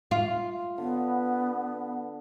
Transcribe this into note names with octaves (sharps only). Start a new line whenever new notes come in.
F4
D3 B3